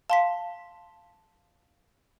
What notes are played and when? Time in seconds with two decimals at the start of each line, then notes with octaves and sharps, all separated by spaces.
0.10 F5 A5 C6 B6